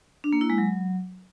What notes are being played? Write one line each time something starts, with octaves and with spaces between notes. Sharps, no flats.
D4
A#3
E4
G#3
F#3